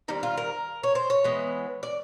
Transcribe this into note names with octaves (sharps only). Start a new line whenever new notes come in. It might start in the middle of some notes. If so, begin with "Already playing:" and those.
D#3 G3 C4 D#4
F4
A#4
C#5
C5
C#5
E3 G#3 B3
D5